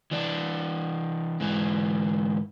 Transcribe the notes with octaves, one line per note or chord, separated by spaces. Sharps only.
E3 D4
G#2 E3